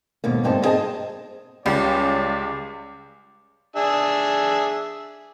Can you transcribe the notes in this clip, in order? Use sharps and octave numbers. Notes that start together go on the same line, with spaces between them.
D#2 G#2 B2 A#3
D2 G2 C4 D#4 A5
B3 C4 G#4 D#5 A5
C#2 G3 C#4 D5
D4 G#4 E5